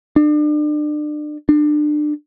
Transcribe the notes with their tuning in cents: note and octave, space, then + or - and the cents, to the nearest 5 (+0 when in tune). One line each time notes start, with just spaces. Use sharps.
D4 +35
D4 +30